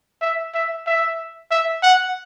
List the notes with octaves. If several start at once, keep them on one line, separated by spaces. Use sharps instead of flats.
E5
E5
E5
E5
F#5